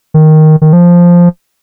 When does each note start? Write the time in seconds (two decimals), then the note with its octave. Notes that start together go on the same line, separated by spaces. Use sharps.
0.14 D#3
0.62 D#3
0.73 F3